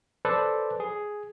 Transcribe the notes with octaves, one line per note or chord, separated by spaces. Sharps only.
A4 B4 C5 D5
G#4